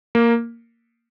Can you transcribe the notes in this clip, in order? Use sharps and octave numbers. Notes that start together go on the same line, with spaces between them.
A#3